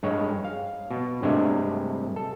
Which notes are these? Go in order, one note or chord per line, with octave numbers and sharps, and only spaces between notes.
G2 G#3 C#5
F5
B2
G2 C3 G#3 A3 D4 G#5
A4